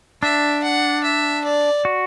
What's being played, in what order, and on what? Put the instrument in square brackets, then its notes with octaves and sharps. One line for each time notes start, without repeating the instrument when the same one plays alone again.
[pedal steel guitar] D4 [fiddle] E5
[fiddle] F#5
E5
D5
[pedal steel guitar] F#4